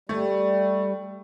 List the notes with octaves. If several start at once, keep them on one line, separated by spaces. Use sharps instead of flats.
G3 A3